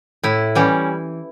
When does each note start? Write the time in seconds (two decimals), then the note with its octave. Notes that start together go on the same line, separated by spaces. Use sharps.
0.23 A2 E4
0.55 E3 G3 C#4